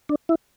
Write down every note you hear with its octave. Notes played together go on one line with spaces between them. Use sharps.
D4
E4